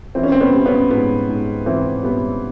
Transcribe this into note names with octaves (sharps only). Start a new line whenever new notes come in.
E3 C4
C#4
C4
B3 C#4
G3
B3 C#4
G#2 B3
G#2
E3 C4
G3 B3